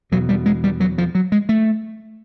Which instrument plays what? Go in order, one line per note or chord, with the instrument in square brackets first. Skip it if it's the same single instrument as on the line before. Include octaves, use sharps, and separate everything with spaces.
[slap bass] E2 B2 F#3
G3
G#3
G3
F#3
F3
F#3
G#3
A3